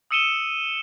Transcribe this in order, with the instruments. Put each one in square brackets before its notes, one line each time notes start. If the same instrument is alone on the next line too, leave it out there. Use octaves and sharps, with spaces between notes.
[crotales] D#6 E6 C#7 D#7 E7 G7